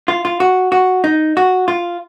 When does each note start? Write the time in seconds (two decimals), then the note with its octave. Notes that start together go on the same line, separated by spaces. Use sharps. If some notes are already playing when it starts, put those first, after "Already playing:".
0.08 F4
0.25 F4
0.40 F#4
0.72 F#4
1.04 D#4
1.37 F#4
1.68 F4